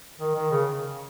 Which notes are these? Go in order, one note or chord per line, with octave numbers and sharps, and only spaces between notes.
D#3
D#3
C#3